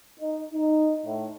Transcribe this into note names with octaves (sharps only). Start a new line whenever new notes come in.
D#4
D#4
A2